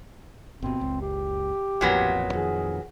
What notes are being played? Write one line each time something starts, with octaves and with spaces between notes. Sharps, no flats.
G1 B2 C4
F#1 C#2
G4
A1 F2 A#2 F#3 B3
F2 D#3 G#4